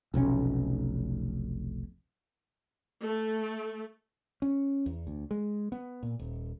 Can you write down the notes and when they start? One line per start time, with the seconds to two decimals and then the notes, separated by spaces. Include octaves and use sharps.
0.14 F1 B1 A2 C#4
3.03 A3
4.42 C#4
4.86 E2
5.07 D2
5.31 G#3
5.72 B3
6.03 A#2
6.19 D#1